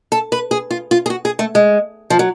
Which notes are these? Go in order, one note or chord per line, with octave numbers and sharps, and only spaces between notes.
A4
B4
G#4
F4
F4
G#4
F#4
G#4
A3
G#3
F3
F#3